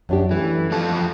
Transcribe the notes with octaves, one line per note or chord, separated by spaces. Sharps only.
F#2 D4 G4
E3 A3
E2 F3 A4